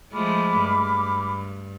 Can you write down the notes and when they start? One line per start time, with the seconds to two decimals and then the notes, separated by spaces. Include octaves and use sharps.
0.13 F3 G#3 A3 B5 D6 F6
0.61 G2